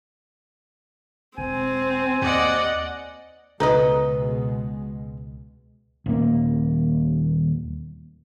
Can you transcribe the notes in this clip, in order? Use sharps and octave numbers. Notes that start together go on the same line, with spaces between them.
E1 C4 G#5
D#2 D5 D#5 F#5
C#2 B2 G#3 D#4 A4 B4 D#5
D#1 A#3